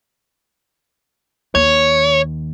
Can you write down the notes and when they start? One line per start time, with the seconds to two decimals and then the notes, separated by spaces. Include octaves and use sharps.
1.55 D#2 C#5